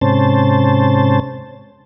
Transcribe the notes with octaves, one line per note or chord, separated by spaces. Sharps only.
G#2 C3 C#4 C5 A5